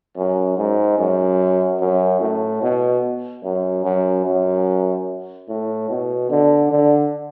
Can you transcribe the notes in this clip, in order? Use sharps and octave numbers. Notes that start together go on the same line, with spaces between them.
F#2
G#2
F#2
F#2
A2
B2
F#2
F#2
F#2
A2
B2
D3
D3